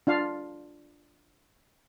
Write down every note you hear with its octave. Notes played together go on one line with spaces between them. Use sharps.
D4 F4 F5